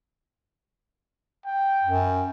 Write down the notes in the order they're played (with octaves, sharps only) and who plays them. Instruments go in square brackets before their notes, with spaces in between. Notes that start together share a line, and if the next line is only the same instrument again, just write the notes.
[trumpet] G5
[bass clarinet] F#2